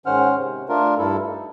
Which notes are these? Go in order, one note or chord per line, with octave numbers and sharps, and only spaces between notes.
G#2 D#3 C#4 C5 F#5 F6
C3
A3 D4 F4 A#4
G2 E4 A4
D#4